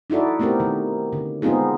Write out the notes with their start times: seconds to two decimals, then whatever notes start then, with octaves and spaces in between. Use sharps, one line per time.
0.10 D#4 E4 F#4 A4 D5
0.39 A3 B3 C4 G4 A#4
0.60 D#3
1.13 D3
1.42 G#3 B3 C4 D#4 F4 G#4